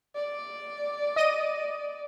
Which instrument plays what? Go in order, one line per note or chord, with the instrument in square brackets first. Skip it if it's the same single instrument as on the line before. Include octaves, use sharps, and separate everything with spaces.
[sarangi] D5
[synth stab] D#5 D#7